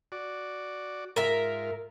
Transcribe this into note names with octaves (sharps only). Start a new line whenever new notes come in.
F#4 D5
G#2 F4 A#4 E5